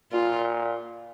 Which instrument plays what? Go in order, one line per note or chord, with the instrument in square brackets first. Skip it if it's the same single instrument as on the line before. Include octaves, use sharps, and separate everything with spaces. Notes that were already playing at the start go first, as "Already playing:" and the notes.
[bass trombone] A#2 [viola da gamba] F4